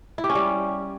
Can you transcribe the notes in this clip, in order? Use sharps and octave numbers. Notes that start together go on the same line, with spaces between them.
E4
G4
C#4
G3